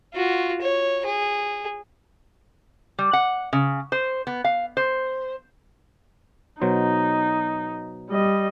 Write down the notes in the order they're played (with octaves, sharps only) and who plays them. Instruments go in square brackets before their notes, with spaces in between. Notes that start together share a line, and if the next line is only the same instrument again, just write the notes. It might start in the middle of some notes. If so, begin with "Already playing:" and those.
[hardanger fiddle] F4 F#4
C#5
G#4
[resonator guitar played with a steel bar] G3
F#5
C#3
C5
B3
F5
C5
[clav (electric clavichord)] B2 F#3 C5 [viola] D#4
[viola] G3 D#5